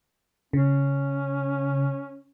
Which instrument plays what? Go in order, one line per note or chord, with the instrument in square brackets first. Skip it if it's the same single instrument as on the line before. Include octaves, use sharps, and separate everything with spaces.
[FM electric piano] C#3 [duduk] C#4